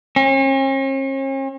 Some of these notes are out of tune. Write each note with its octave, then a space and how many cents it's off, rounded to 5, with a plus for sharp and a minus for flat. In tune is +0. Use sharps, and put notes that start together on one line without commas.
C#4 -45